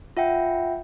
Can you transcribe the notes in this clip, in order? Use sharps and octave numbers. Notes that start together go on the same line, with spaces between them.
F4 E5 F#5 G5